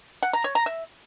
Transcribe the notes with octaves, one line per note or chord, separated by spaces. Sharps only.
F#5
A#5
C#5
A#5
E5